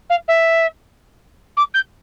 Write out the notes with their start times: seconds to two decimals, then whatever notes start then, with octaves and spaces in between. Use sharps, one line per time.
0.09 F5
0.28 E5
1.57 D6
1.74 G6